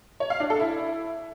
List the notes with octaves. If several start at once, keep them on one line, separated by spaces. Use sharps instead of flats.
C#5
F5
D4
A4
E4